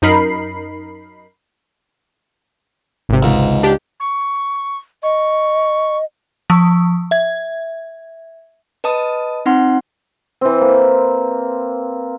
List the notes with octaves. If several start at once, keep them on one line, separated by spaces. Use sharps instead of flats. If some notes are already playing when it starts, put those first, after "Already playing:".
F#2 D#4 A#4 B5 C7
G#1 C3
C#2 G#2
D4 G4
C#6
D#5 C#6
F3 C#6 E6
E5 G#6
B4 D#5 A5 D#6
C4 D#4 F#5 C6
E3 C4
A#3